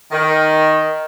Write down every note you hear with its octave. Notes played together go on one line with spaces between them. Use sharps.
D#3